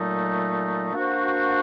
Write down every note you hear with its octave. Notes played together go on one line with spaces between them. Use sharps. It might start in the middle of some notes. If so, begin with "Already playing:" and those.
Already playing: A#2 F#3 A3 D#4
A#3 D4 F#4 C5